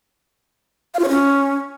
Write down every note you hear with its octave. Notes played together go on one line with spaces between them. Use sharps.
F5
F4
C#5
C#4